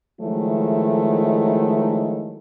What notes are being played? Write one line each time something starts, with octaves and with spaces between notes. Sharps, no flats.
D#3 F3 F#3 G#3 A3 E4